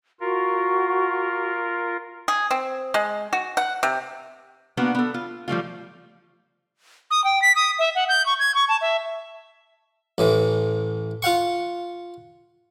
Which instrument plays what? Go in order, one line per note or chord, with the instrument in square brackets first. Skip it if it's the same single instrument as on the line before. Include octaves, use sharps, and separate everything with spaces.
[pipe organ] F4 A#4 [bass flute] F#4
[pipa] G#4
C4
G#3
F#4
F#5
C3
[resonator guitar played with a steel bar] A#3 B3 D4 F#4
B3 A4
F4
F3 G3 A3 F4
[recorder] D#6
G5
B6
D#6
E5
F#5
G6
C#6
G#6
C#6
A5
E5
[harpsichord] A1 A2 E3
F4 F5 F#5 C#6